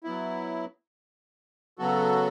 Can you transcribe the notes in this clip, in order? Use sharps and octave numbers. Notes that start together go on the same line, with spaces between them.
F#3 B3 E4
C#3 F#3 B3 F#4 A4